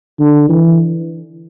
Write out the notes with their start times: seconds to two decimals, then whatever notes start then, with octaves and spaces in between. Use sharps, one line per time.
0.20 D3
0.49 E3